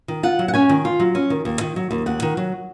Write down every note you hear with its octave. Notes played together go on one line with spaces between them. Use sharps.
D#3
F4 F#5
F#3
F#5
C#4 G#5
D#3
F4
F#3
C#4
D#3
D#2
D#3
F#3
D#2
D#2 F#5
D#3
F#3